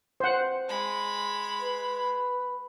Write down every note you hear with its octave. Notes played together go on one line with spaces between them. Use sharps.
C5 F#5
G#3 B5
B4